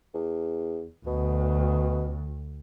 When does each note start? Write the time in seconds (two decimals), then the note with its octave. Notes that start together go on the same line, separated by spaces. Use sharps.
0.14 E2
1.07 D2 B2